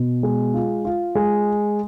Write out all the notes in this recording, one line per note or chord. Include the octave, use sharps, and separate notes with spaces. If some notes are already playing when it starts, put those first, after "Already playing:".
Already playing: B2
G#3
F4
F4
G#3